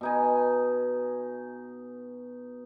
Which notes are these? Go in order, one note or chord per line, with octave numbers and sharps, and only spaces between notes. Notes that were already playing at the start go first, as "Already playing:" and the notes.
B2 D#4 G#5